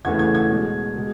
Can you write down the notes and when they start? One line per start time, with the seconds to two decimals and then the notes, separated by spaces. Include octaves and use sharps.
0.05 E2 C#3 E3 A3 G#6
0.19 G#6
0.35 G#6
0.50 B2 G#3
0.95 B2 G#3